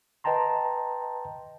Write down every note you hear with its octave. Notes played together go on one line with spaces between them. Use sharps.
B4 D#5 G5 A5 A#5 C6